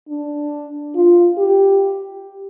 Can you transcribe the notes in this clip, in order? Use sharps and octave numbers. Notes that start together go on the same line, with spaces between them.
D4
F4
G4